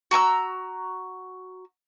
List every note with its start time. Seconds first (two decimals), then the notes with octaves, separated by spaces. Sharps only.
0.11 F#4 A#5 C#6 E6